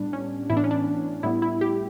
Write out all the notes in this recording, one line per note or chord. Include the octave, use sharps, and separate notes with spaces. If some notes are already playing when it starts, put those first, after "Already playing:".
Already playing: A2 G3 B3 D4
C#4
A2 E3 B3 E4
D4
C#4
D4
A2 G3 B3 E4
E4
G4